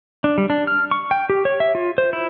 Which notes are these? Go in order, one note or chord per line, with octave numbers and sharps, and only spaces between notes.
D4
G3
D4
F6
C#6
G5
G4
C#5
E5
F4
C5
E4